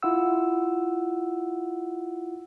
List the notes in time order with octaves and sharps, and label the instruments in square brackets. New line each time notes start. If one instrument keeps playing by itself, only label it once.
[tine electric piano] E4 F4 F#5 E6